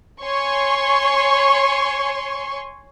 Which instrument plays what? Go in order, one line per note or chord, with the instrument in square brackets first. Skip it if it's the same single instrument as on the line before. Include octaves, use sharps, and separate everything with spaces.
[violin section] C#5 G#5 C6 C#6